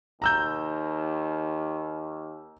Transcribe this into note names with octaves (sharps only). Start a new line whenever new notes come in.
D#2 A#5 E6 G6